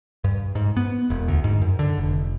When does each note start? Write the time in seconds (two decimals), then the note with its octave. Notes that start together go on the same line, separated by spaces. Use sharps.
0.24 G2
0.55 G#2
0.77 B3
1.10 E1
1.28 D2
1.44 G#2
1.62 F#2
1.79 D3
1.98 F1